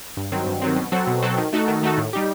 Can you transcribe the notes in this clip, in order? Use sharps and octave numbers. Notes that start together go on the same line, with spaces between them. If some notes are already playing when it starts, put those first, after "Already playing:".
G2
D#3 F#3 C4
G2
D#3 F#3 C4
B2
F#3 C4 F#4 A4
B2
F#3 C4 F#4 A4
D#3
A3 D#4 F#4 A4
D#3
A3 D#4 F#4 A4
A2
G3 D#4 G4